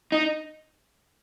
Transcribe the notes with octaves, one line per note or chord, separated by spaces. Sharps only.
D#4